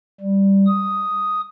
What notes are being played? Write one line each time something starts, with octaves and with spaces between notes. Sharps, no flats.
G3
D#6